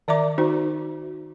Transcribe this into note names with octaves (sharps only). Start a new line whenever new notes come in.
D#3 D5 E5 A#5 D6
D#4 F#4 C5